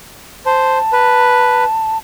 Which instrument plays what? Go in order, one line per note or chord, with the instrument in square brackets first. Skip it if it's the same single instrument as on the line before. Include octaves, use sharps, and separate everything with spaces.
[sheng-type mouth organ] C5 [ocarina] A5
[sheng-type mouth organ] B4